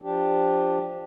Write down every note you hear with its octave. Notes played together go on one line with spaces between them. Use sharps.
F3 D4 G4